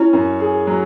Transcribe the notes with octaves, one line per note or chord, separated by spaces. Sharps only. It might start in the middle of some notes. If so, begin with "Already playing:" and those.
Already playing: C#4 E4
F#2
G#4
F#3